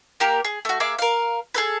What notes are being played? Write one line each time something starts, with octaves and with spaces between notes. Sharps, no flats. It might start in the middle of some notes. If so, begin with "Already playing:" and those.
A#3 G4 A#4
G#4
A3 F#4
A#3 G#4 E5 D6
A#4 F5
G#4 A4 B4